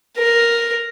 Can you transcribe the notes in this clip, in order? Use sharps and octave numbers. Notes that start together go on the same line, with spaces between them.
A#4